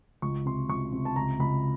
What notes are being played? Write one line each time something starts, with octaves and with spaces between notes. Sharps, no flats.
C#2 C#6
C3 C6
C#2 C#6
C3
A5
C#2 A#5
C#2 B5